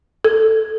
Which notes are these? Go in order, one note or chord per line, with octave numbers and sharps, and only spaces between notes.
A4